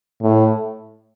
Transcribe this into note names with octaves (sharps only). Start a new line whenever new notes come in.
A2